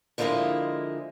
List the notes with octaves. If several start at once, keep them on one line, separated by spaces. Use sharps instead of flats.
D3 F3 G#3 A#3 E4 D#5